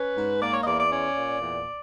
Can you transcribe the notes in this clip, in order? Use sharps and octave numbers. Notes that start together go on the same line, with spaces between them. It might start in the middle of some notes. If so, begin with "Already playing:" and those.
Already playing: C#4 B4
G#2
A#3 D5
C#5
D#5
E2 D5
D5
C#4 D5
A#2
E2